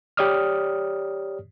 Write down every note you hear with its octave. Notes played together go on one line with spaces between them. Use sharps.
G4 C#5 D5 D#6 F6